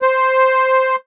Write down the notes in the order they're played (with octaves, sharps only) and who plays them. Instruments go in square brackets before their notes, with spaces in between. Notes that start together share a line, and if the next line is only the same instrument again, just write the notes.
[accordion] C5